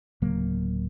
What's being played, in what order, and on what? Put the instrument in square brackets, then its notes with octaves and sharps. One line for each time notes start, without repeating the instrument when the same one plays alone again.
[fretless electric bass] D1 C#3 F#3 A#3